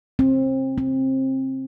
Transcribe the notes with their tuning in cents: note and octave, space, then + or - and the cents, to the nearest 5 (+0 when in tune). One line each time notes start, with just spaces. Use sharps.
C4 +25
C4 +20